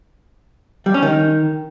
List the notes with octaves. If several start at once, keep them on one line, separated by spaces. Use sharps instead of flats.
G3
C#4
D#3